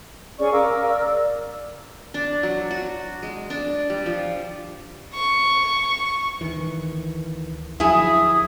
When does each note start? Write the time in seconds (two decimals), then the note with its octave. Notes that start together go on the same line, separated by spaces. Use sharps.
0.39 C#4 G#4 D5 C#6
0.53 A#4 F5 D6 E6
0.88 D5
2.14 D4
2.43 F#3
2.71 F#4
3.23 G#3
3.50 D4
3.90 G3
4.06 F3
5.14 C#6
6.41 D2 D#3 E3
7.80 D2 F3 F#3 E4 G#4 D#6